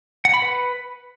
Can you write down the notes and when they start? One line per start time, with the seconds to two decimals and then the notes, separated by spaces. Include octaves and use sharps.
0.25 F#5
0.34 B5
0.42 B4